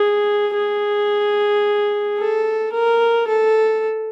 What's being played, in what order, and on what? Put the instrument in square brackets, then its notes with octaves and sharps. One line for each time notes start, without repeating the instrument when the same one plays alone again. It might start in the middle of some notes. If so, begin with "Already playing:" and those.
Already playing: [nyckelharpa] G#4
G#4
A4
A#4
A4